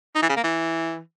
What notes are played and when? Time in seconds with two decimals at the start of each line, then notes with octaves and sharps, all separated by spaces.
0.15 D#4
0.22 E3
0.29 C#3
0.37 A#3
0.44 E3